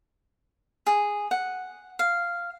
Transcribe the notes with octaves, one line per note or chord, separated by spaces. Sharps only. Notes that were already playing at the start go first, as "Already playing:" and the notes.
G#4
F#5
F5